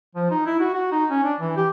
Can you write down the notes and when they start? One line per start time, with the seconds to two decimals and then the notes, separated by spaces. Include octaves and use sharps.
0.16 F3
0.31 D#4
0.46 E4
0.60 F#4
0.74 F#4
0.92 D#4
1.11 C#4
1.24 D4
1.40 E3
1.57 G4